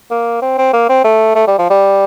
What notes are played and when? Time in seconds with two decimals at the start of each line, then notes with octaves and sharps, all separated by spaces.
0.11 A#3
0.42 C4
0.58 C4
0.73 A#3
0.89 C4
1.04 A3
1.35 A3
1.47 G3
1.58 F3
1.70 G3